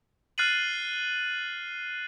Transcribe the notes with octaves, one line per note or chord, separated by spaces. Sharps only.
F6 F#6 A6 C7 D#7 F#7